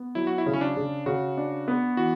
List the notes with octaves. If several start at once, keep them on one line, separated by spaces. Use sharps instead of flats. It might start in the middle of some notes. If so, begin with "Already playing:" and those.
Already playing: B3
F#3 E4
F#4
E4
C#3
C#4
D4
C#3
C#3 F#4
D4
B3
E3 F#4